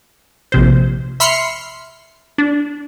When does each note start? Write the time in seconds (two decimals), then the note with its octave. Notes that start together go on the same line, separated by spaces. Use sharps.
0.52 A#1 C3 C5
1.20 E5 B5 C6 F6 C7 C#7
2.38 D4